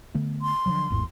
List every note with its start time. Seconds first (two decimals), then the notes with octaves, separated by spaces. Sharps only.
0.14 D3 A3 B3
0.42 C6
0.66 D3 F3 F#3
0.90 G#1 E2 A2